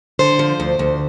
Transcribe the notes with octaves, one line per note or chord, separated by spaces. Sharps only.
D3 C5
F3
D2
D2